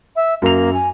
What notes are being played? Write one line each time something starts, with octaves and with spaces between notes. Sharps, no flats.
E5
F#2 A#3 F7
G#5